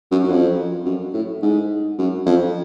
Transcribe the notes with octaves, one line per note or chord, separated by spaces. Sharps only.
F#2
F#2
F2
F#2
A2
G#2
F#2
F2